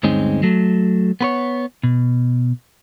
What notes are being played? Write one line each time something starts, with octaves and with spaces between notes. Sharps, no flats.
D2 G2 G#3 C4 C#4 D#4
F#3 A3
B3 B4 C#5
B2